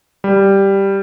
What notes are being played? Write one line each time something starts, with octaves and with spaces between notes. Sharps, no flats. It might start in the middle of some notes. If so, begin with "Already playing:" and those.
G3